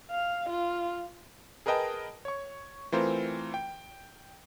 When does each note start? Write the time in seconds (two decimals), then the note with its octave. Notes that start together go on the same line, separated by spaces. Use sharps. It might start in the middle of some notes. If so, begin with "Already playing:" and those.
0.11 F5
0.49 F4
1.66 G#4 A#4 B4 D#5 G5 A5
2.25 C#5 C#6
2.92 E3 A3 C4 F4 A#4 C5
3.54 G5